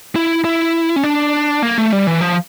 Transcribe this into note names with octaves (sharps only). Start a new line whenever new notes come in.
E4
E4
C#4
D4
A#3
A3
G3
E3
F3